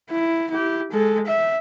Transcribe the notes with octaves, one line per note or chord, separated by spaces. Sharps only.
E4
E4 G4
G#3 A4
E5